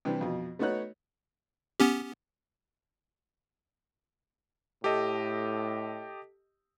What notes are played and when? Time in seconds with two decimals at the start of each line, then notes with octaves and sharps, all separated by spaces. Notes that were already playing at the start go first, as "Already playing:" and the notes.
0.05 C3 E3 G3 D4
0.21 F2 B2
0.59 A3 B3 D#4 F#4 C#5 F#6
1.80 B3 C#4 G4
4.84 A2 G4 A4 D#5